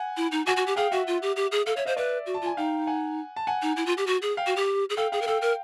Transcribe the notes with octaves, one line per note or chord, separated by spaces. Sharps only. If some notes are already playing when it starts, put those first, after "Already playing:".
Already playing: F#5 G#5
E4
D#4
F#4 F#5 G#5
F#4
G4
G#4 F5 G5
F#4 E5 F#5
F4
G4
G4
G#4
A4 F5
C#5 E5
C5 D#5 F5
B4 D5 E5
F#4
A5
F4 G#5
D#4 F5 G5
F#5 G#5
A5
F#5 G#5
D#4
E4
F4
G4
F#4
G#4
F5 G5
F#4
G4
G#4
A4 F5 G5
G#4 F5 G5
A#4
A4 F5 G5
A#4